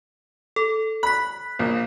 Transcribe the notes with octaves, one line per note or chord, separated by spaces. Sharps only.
A4
B5 F#6 B6
A#1